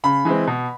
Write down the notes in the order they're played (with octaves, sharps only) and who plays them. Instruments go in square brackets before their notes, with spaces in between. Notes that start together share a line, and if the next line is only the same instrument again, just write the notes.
[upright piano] C#3 B5
E3 G#3 C4
B2